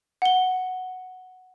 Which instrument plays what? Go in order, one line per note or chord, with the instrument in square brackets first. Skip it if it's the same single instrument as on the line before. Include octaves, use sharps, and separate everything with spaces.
[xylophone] F#5 G7